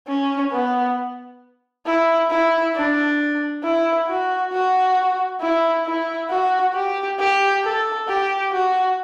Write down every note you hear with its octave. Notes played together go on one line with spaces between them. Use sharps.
C#4
B3
E4
E4
D4
E4
F#4
F#4
E4
E4
F#4
G4
G4
A4
G4
F#4